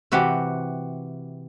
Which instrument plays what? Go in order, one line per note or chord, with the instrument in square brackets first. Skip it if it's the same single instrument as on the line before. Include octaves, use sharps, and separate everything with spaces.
[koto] C3 E3 F#4 G4